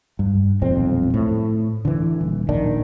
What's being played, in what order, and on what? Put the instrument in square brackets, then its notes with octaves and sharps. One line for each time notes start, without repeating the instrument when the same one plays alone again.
[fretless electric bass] G2
D#1 B1 F2 C4
A2
D3 E3
D#1
A#1 D#3 D4